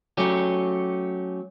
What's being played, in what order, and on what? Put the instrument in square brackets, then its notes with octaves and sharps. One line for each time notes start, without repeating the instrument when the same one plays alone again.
[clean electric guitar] F#3 A3 C#4 G4